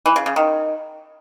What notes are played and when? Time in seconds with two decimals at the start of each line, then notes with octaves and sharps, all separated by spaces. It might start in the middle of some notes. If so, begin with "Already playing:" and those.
0.06 E3
0.16 C#3
0.26 C#3
0.36 D#3